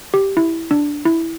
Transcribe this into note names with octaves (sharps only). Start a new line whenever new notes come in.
G4
E4
D4
E4